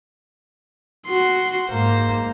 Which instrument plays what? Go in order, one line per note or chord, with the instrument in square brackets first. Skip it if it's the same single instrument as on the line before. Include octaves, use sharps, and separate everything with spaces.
[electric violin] F#4 C6
[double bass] G#2 A#3 [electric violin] C5